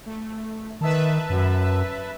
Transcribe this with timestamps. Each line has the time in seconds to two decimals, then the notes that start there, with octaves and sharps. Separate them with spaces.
0.06 A3
0.81 D#3 B4 E5 A5
1.30 F#2